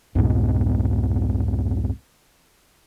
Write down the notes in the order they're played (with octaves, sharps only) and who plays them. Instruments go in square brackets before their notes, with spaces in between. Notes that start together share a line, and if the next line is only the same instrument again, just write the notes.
[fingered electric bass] C2 F2 G#2 B2